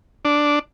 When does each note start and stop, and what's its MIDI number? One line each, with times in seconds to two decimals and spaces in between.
0.25 0.59 62